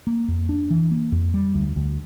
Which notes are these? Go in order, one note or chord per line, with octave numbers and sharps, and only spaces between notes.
A#3
F2
D4
E3
A#3
F2
G3
D2
D2